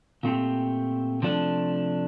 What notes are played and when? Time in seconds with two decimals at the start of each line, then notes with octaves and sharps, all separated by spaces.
0.23 A#2 A3 C4 G4
1.22 C3 F3 A3 D4